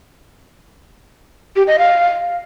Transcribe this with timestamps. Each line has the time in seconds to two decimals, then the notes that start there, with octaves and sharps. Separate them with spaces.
1.56 G4
1.67 D#5
1.79 F5